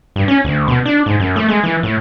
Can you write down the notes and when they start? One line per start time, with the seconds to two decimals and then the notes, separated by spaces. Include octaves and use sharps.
0.16 G2
0.28 C#4
0.45 D2
0.68 B2
0.85 D4
1.06 G#2
1.20 F#2
1.36 A3
1.49 G#3
1.64 E3
1.83 A2